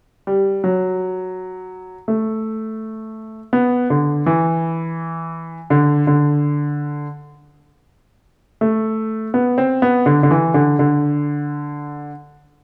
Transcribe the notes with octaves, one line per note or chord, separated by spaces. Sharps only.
G3
F#3
A3
B3
D3
E3
D3
D3
A3
B3
C4
B3
D3
D3
E3
D3
D3